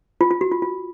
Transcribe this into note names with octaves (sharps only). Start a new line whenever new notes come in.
F4
F4
F#4
F4
F4